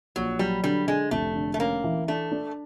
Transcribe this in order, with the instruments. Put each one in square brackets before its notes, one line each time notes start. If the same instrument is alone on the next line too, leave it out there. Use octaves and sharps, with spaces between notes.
[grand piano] A#1 [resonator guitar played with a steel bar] F#3
[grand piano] F#3 [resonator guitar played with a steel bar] G3
[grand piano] D3 [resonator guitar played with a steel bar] G3
[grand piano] D3 [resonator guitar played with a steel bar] G#3
[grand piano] F1 [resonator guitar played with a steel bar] A3
[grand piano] D3
[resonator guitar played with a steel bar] A3
[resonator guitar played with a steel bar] A#3 [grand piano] C#4
[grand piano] E3
[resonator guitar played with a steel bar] A3 [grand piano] D4
[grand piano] D4